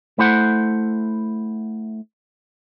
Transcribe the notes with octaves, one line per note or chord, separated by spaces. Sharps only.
A3 E4 C5 F#5